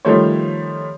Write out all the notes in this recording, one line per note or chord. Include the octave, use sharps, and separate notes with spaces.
D#3 F3 G3 A3 C5 C#5